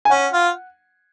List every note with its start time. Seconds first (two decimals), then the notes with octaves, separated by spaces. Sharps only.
0.05 G#5
0.10 C#4 F#5
0.33 F4